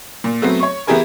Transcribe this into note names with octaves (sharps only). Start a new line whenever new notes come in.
A#2
F#3 A3 B3 C4
C#5 C#6
E3 B3 E4 G4 G#4 A#4